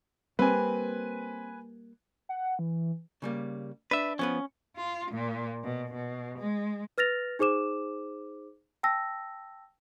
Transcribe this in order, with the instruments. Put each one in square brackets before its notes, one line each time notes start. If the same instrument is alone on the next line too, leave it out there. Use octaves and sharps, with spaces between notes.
[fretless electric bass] G3 A#3 [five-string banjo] C4 [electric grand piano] B4 G#5
[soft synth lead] F#5
E3
[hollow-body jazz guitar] C#3 G3 A#3
[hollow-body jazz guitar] D4 [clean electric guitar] B4 E5
[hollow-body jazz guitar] F3 B3 B4 [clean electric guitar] C#4
[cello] F4
A#2
B2
B2
G#3
[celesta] B4 F6 A6 A#6 F7
D#4 G#4 C5 D6 E7
G5 A5 E6 A#6